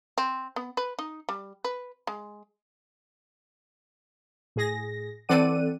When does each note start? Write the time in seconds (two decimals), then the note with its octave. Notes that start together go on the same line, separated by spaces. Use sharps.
0.18 C4
0.56 B3
0.77 B4
0.99 D#4
1.29 G3
1.64 B4
2.07 G#3
4.56 A2 G#4 A#6
5.29 E3 C4 A4 D5 F#5 D#7